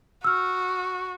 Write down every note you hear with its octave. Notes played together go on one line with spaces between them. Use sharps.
F#4 E6 F6